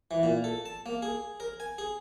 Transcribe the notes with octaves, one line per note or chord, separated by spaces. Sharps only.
E3
A#2
A4
A5
A#3
G#4
A#4
G#5
G#4